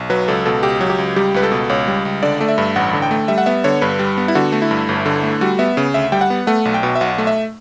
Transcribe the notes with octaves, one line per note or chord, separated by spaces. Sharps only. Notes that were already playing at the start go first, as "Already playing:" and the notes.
Already playing: B1
F#3 B4
C#2 A4
B2 A4
C#2 G4
F#3
G4
C#2
G3 G4
C#2 B4
A4
B2
C#2 C#5
G3
C#2
D3 D5
A3
E5
G2
A1 F#5
D3
G5
A3
G3 E5
F#5
B3 E5
D3 C#5
G2 B4
G3
B3
E4
D3 F#4
A3
E4
G2
G1
D3
A3
G3 F#4
B3 E5
C#3
D2 E5
G3 G5
F#5
B3
A3 F#5
B1
G5
B2
E5
B1 F#5
A3
E5